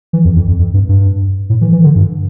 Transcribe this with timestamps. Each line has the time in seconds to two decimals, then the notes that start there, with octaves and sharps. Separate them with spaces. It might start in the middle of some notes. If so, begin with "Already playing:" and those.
0.13 E3
0.25 F2
0.36 F2
0.48 F2
0.59 F2
0.74 G2
0.89 G2
1.50 A2
1.61 E3
1.72 E3
1.84 D3
1.96 G2